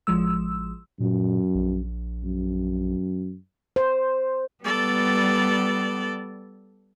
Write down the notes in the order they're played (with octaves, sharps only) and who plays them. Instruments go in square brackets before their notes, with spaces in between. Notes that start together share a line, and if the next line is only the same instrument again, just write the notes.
[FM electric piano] A1 F3 G#3 E6
[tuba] F#2 [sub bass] A#2
[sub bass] A#1
[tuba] F#2
[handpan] C5
[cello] G3 B3 [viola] A4 D5